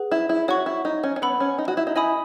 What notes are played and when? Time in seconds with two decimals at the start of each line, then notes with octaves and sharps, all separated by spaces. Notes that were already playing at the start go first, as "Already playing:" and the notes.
Already playing: G#4 B4 F#5
0.11 E4
0.29 E4
0.48 F#4 C#5 F#5 C#6
0.66 E4
0.85 D#4
1.03 C#4
1.16 C#4
1.22 B3 B4 F#5 B5 E6
1.40 C#4
1.58 D#4
1.68 F#4
1.77 E4
1.87 D#4
1.96 E4 D#5 G#5 B5 D#6